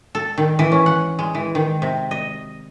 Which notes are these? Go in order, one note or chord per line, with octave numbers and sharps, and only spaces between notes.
A4
D#3
E3
C#4
F#5
G#3
E3
D#3
C3
D#5